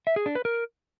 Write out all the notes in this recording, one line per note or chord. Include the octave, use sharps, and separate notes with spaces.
E5
G#4
D4
B4
A#4